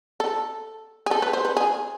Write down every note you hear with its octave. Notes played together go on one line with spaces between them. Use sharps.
A4
G#4
A4
B4
C5
B4
G#4